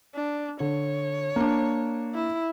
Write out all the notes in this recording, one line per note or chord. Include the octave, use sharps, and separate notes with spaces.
D4
D3 C#5
A#3 D4
E4